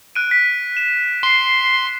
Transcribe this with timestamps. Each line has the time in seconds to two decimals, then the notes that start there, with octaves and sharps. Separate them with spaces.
0.15 F#6 D7 D#7
0.31 B6
0.77 E7
1.23 C6 C7